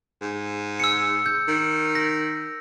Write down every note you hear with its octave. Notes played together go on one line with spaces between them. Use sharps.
G#2
E6 C#7
G6
D#3
A#6